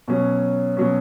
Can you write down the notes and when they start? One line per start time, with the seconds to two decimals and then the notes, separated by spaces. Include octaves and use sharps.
0.08 B2 F#3 C#4
0.77 B2 F#3 C#4